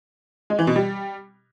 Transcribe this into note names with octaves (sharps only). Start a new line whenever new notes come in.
G#3
E3
B2
G3